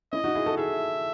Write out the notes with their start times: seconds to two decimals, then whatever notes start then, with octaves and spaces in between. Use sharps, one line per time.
0.12 C#4 E4 D#5
0.24 D#4 F#4
0.35 E4 G#4
0.46 F#4 A4
0.57 E4 G#4 E5